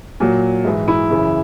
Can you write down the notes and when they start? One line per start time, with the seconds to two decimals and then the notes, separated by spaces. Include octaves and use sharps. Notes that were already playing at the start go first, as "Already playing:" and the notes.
0.20 A#2 F#3
0.64 G#2 E3
0.88 E4
1.10 F#2 C#3 E3